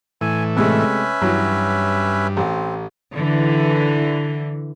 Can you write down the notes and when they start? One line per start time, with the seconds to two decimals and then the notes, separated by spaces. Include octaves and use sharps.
0.21 A2 E3 G#5
0.56 C3 G#3 A3 C#4 B4 E5
1.22 G2 E3 F#3
2.37 A1 C4
3.15 D3 E3